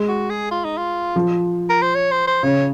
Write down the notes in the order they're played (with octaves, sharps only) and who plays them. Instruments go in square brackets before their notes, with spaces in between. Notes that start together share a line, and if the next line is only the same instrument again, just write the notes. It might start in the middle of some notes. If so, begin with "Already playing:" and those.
Already playing: [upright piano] G#3
[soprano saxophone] F#4
G#4
F4
D#4
F4
[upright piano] F3
[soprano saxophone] A#4
C5
C#5
C5
C5
[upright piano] C#3 [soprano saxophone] C#5